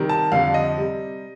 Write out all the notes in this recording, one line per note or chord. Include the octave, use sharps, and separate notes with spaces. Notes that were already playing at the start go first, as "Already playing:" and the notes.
Already playing: C3 D#3 G3
A5
F2 D3 G3 F5
D#5
C3 G3